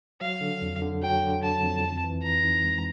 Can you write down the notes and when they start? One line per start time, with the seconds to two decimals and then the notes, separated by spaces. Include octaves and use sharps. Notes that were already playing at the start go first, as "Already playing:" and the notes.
0.21 F#3 F5
0.41 D3
0.62 F2
0.82 D3
1.02 F#3 G5
1.23 D3
1.42 D3 A5
1.63 F2
1.83 C4
2.04 E3
2.23 E3 A#5
2.43 D#4
2.64 G#3